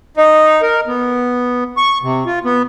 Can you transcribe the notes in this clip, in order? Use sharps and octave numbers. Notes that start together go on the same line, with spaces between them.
D#4
A#4
B3
C#6
C3
F4
B3